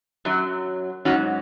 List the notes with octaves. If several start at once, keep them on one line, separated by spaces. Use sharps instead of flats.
F#2 F#3
G#2 F#3 C#4 F#4